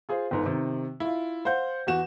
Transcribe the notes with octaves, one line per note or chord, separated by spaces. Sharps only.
F4 G#4 C5
G1 G#2
C3 D#3
E4 F4
C5 F5 F#5 G6
E2 F#4 E7